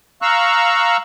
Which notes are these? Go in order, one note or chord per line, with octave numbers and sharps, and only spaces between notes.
F5 A#5 C#6 E6 F#6